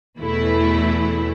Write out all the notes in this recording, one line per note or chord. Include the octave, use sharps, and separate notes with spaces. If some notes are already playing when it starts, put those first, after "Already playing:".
E2 B2 E3 A3 E4